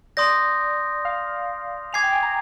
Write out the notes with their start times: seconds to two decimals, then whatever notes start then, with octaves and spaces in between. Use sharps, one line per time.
0.17 D5 C6 D#6 G6 A#6
1.05 F5
1.93 G#5 D6 G#6 C7 F7
2.03 G5
2.12 G#5
2.23 A#5